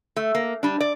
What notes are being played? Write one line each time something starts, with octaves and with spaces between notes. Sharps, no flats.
A3
A#3
G3 D4
D5